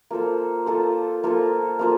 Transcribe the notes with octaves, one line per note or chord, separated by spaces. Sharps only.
A#3 F4 A4 C5
A#3 F4 A4 C5
A#3 F4 A4 C5
A#3 F4 A4 C5